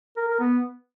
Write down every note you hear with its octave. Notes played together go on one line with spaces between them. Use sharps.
A#4
A#4
B3